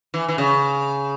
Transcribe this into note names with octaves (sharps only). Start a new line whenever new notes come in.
E3
E3
C#3